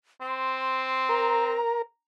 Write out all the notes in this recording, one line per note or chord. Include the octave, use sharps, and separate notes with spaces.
C4 C6
A#4 A#5